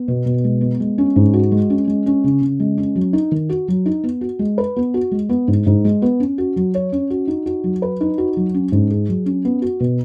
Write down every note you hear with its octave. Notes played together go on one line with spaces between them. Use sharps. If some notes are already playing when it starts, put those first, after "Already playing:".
Already playing: B3
B2
B2
G#3
B3
G#3
C#4
G#2
F#4
G#3
C#4
G#3
C#4
C#3
C#3
G#3
C#4
F#3
D#4
D#3
F#4
F#3
D#4
B3
F#4
G#3
B4
B3
F#4
G#3
B3
G#2
G#2
G#3
B3
C#4
F#4
F#3
C#5
C#4
F#4
D#4
F#4
F#3
B4
D#4
F#4
F#3
C#4
G#2
G#4
F#3
C#4
B3
F#4
B2